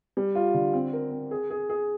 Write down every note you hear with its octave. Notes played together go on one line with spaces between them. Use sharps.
G3
F4
D3
C4
A#4
C4
G#4
G#4
G#4